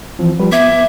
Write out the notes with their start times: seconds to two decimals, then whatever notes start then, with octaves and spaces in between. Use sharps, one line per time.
0.19 E3 F3 C4
0.39 F3 G3 B4
0.52 B3 E5 D6 G#6